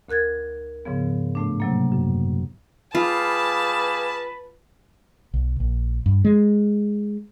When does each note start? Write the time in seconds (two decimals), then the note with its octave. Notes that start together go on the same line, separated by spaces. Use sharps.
0.09 D2 A#4 F#6 G#6 A6
0.85 G#2 C#3 F3 B3
1.35 A2 A3 D4
1.60 C3 F#3 A#3
1.92 F#2
2.95 G3 F4 G#4 B4 F5 A5
5.34 B1
5.60 A#1
6.06 G2
6.25 G#3